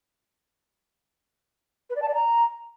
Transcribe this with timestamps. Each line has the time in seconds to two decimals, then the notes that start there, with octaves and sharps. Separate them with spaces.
1.90 B4
1.96 D5
2.02 A5
2.08 D5
2.14 A#5